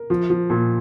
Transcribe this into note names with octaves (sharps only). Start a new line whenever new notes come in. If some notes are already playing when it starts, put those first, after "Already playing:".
Already playing: A#4
F3
F3
A#2